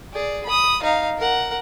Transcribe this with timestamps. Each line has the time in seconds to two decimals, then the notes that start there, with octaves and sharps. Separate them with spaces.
0.13 G#4 D5
0.45 B5 D#6
0.82 D#4 F5
1.18 A#4 F#5